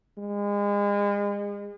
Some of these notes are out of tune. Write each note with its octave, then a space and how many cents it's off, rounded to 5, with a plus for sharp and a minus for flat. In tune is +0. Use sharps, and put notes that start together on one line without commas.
G#3 -35